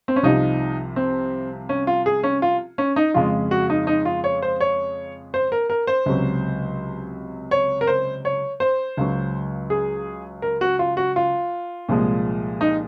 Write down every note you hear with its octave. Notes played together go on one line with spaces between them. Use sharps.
C4
C#4
C2 C3 F3 D#4
C4
C#4
F4
G#4
C#4
F4
C#4
D#4
F2 C#3 G#3 F4
F#4
D#4
D#4
F4
C#5
C5
C#5
C5
A#4
A#4
C5
C#2 C3 F#3
C#5
A#4
C5
C#5
C5
C#2 C#3 F#3
G#4
A#4
F#4
F4
F#4
F4
C2 A#2 F3 G#3
D#4